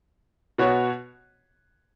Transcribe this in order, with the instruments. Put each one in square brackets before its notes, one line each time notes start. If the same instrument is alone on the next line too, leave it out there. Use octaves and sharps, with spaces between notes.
[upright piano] B2 B3 F#4 C#5